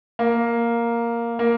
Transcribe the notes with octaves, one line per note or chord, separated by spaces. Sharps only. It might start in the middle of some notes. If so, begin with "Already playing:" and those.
A#3
A#3